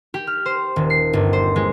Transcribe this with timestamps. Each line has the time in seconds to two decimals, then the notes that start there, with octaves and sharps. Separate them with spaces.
0.14 G4
0.27 F6
0.46 C5
0.76 D#1
0.90 C7
1.13 G1
1.33 C5
1.56 G#3